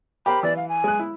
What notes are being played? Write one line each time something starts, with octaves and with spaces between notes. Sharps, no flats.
G4 A#4 C5 B5
E3 D5
F5
G#5
G#3 F#6
E4